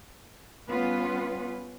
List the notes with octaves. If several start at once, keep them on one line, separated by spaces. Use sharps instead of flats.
G3 B3 C#4 F4 B4